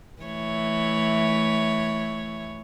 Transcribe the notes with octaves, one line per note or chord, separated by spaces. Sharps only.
E3 A3 C#5